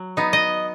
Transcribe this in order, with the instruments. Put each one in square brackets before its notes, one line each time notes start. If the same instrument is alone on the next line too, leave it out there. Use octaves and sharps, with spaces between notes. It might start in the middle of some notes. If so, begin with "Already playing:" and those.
Already playing: [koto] F#3
B3 D#4
D#5